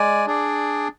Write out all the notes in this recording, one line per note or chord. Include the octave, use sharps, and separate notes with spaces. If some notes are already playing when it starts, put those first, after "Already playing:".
Already playing: G#3 D5 G#5
D4 G#4 D5